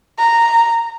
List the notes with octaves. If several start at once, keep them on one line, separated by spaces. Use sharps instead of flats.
A#5